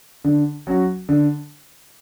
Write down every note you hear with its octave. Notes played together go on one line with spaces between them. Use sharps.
D3
F#3 C#4 F#4
D3